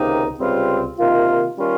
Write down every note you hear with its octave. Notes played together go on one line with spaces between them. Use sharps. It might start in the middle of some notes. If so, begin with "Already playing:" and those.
Already playing: C#2 C3 D#3 A#3 D#4
C#2 C3 G3 C4 F4
C3 D#3 A#3 F4
D#3 G3 C#4 F4